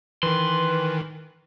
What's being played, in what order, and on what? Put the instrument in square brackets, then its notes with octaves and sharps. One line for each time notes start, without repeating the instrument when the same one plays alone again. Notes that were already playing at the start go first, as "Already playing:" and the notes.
[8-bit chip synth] D#3 E3 [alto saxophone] B4 [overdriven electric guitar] C6